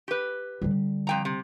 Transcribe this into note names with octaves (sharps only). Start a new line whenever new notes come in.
G4 B4
D3 G3
F2 G5 A#5
C3